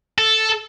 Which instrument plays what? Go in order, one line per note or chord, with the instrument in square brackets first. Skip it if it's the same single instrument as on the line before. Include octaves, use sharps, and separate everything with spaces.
[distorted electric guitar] A4